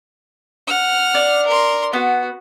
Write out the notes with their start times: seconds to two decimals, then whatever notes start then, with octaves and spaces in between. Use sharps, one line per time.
0.67 F#5 F6
1.15 D4
1.46 A#4 C6
1.93 B3 F#4